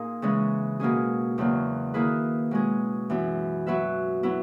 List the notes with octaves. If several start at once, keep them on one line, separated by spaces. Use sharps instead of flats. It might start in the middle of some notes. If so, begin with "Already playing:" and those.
Already playing: A#2 D#4 G#4
C#3 E3 G#3 C#4
B2 A#3 C#4 G#4
E2 C#3 F#3 A#3
D#3 A#3 E4 G#4 B4
B2 G#3 C#4 G#4
F#2 E3 B3
F#3 B3 F#4 B4 E5
F#3 B3 E4